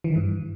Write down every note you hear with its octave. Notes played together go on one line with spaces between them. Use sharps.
E3
D#3
G2